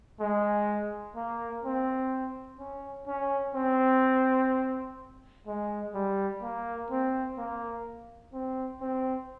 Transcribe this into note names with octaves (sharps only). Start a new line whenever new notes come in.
G#3
A#3
C4
C#4
C#4
C4
G#3
G3
A#3
C4
A#3
C4
C4